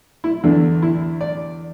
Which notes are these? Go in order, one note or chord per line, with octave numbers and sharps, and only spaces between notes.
E4
E2 D3 D4
E4
D5